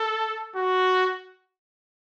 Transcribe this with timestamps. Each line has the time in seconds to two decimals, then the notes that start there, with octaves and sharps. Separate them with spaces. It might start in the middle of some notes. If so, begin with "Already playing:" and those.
Already playing: A4
0.56 F#4